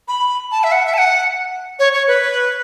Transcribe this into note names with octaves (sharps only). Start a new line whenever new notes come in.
B5
A5
E5
F#5
E5
A5
F#5
C#5
C#5
B4